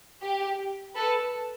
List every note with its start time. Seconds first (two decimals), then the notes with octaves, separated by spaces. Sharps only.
0.22 G4
0.95 A4 B4